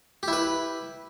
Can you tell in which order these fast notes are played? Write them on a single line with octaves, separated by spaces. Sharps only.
G4 E4 B4